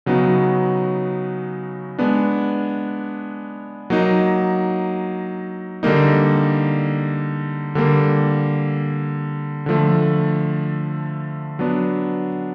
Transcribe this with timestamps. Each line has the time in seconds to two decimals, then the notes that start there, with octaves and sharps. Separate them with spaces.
0.06 C#3 F#3 B3 D#4 F#4
1.98 G#3 B3 D4
3.90 F#3 A#3 D#4
5.83 D3 G3 A#3 D#4
7.75 D3 G3 A#3
9.66 D3 F3 A3
11.59 F#3 B3 D4